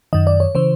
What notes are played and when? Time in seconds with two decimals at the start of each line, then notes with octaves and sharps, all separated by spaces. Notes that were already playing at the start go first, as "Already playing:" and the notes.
0.13 F#2 D#3 D#5
0.27 D5
0.40 C#5
0.55 C#3 E3 C5